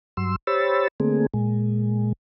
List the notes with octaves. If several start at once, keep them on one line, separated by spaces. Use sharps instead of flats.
G2 F#3 C6 E6
G4 C5 C#5 B5 E6 A6
D3 A3 A#3 C4 G#4
A#2 G#3